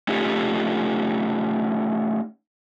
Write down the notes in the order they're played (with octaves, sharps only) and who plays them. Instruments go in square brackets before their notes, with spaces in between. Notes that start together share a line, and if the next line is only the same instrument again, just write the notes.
[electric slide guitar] A3 C#4 D#4 F4 G4 A4